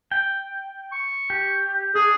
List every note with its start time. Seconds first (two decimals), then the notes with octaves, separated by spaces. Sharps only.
0.11 G5
0.92 C#6
1.30 G4
1.95 D4 G#4